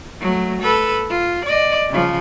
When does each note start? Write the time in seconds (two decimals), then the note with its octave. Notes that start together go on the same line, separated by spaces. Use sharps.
0.21 F#3 A3
0.62 A4 B4
1.10 F4
1.45 D5 D#5
1.90 C#3 F3